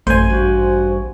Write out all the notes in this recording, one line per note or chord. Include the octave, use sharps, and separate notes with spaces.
A1 F#2 A3 C5 G#5
G2 F#4